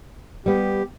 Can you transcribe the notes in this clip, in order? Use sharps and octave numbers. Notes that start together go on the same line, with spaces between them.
G3 B3 G4